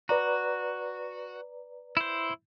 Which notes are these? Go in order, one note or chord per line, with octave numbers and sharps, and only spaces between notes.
F#4 B4 D5 A#5
E4 C5